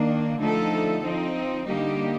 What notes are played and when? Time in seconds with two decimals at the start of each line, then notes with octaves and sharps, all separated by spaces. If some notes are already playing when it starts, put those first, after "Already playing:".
Already playing: D#3 A#3 D4
0.39 D3 F3 A3 D#4 A4
1.03 F3 C4 D#4
1.67 D3 G3 A#3 D#4 G4